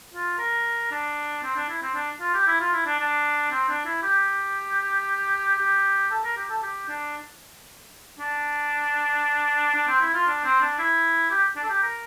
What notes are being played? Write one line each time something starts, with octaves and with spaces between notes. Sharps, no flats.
F4
A#4
D4
C4
D4
E4
C4
D4
F4
G4
E4
F4
E4
D4
D4
C4
D4
E4
G4
G4
A4
A#4
G4
A4
G4
D4
D4
D4
C4
E4
F4
D4
C4
D4
E4
G4
D4
A4
G4
A#4